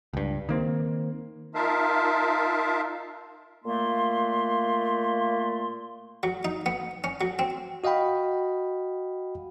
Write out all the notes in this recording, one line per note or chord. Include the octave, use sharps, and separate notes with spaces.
C#2 G2
D#3 A#3 C4
D#4 F4 A#4 E5 F5 A5
A#2 A3 A#3 C6
F#3
D#4
B3
C#4
F#3
C4
F#4 D#5 F5 G5 B5